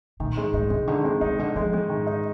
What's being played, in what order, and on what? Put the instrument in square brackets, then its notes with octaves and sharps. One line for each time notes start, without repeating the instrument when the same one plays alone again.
[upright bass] A#2 [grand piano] D#3
[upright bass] G#2 [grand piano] G#3
[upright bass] G#2 [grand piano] D#4
[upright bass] C3 [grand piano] G#3
[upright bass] D3 [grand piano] D#3
[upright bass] C3 [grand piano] G#3
[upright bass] C3 [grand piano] D#4
[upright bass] D3 [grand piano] G#3
[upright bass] F3 [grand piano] G#3
[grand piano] G#3
[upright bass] G#2 [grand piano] D#3
[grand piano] D#4